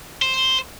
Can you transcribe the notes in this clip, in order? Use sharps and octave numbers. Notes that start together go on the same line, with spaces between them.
C5